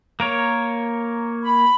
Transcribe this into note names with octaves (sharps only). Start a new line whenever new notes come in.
A#3 A#4 C#5
B5